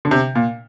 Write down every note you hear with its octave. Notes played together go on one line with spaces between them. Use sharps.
D3
C3
A#2